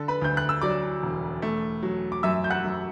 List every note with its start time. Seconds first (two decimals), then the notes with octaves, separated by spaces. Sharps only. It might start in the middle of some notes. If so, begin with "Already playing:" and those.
Already playing: D3 A4
0.08 B4 B5
0.22 D2 G6
0.37 F#6
0.49 E6
0.61 F#3 D5 D6
1.03 E1
1.42 A3
1.83 F#3
2.12 D6
2.23 F#2 E5 E6
2.44 G6
2.50 F#5 F#6
2.64 F#2